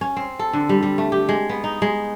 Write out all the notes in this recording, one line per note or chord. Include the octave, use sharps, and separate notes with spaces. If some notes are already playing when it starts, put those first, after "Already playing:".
C#4
C4
A4
D3
G3
G3
A3
G4
G#3
B3
D#4
G#3